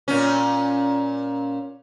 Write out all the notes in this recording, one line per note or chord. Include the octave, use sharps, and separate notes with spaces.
A#2 C#4